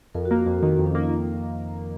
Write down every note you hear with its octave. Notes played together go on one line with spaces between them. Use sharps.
F2 A#4
F#4
A#3 F4
F2 F#4
A4
D#3 F#4
F2 A4
C#4
A#3 D#4
F4